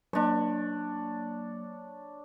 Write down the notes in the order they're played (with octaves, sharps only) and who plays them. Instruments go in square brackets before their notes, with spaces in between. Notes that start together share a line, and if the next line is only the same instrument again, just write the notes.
[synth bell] F#3 A#3 [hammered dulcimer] D4 C#5